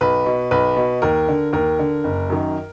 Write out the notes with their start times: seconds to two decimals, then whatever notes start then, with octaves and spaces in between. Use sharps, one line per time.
0.01 B1 B4
0.26 B2
0.51 B1 B4
0.77 B2
1.02 D#2 A#4
1.28 D3
1.53 D#2 A#4
1.79 D3
2.04 F#1
2.30 F#2 D#3